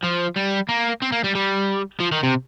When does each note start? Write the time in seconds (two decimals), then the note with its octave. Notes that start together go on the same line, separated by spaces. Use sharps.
0.03 F3
0.36 G3
0.69 A#3
1.02 C4
1.12 A#3
1.24 G3
1.35 G3
2.00 F3
2.12 D#3
2.23 C3